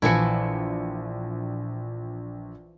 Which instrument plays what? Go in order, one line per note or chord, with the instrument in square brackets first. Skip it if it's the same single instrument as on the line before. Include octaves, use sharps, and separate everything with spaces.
[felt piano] A#1 C#7 [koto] E3 F3 E4